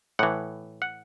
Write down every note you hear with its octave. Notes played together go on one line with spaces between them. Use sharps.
A2 E3 F#5
F#5